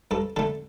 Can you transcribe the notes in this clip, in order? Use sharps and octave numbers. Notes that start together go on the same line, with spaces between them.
G2 A4
D3 A3 A4